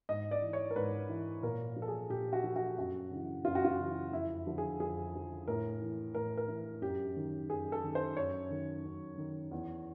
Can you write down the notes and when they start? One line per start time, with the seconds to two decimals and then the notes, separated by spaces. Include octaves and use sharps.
0.09 G#2 D#5
0.31 D5
0.42 E3
0.53 C#5
0.71 A#4
0.76 G#2 B4
1.09 E3
1.43 A#2 A#4
1.76 F3
1.82 A4
1.88 G#4
2.10 A#2 G4
2.33 F#4
2.44 F3
2.56 F#4
2.78 F#2 F#4
3.11 C#3 E3
3.45 F#2 F4
3.55 F#4
3.65 F4
3.79 C#3 E3
4.12 F2 E4
4.46 D3 F3
4.58 G#4
4.80 F2 G#4
5.13 D3 F3
5.48 A2 A#4
5.82 E3
6.15 A2 A#4
6.37 A#4
6.48 E3
6.82 F#2 G4
7.16 D#3
7.50 F#2 G#4
7.72 A4
7.83 D#3
7.95 C5
8.16 F#2 C#5
8.50 D#3
8.85 F#2
9.18 D#3
9.51 E2